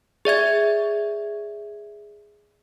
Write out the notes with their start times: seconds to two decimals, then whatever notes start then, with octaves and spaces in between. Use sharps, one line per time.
0.25 G#4 D5 E5 G#6